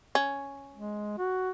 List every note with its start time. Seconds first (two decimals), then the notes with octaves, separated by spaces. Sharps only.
0.15 C#4
0.74 G#3
1.18 F#4